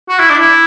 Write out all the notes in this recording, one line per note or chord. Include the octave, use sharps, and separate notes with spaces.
F#4
E4
D4
E4